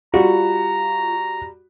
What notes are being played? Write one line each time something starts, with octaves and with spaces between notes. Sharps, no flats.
G3 F4 F#4 A#5